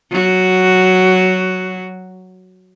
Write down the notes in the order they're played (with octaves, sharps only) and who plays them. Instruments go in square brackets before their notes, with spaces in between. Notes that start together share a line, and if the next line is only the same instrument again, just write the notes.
[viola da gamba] F#3 F#4